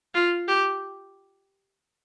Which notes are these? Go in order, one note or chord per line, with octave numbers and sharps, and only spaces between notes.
F4
G4